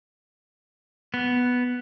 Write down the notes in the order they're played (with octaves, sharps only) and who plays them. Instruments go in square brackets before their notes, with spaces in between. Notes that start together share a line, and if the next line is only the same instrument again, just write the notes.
[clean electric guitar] B3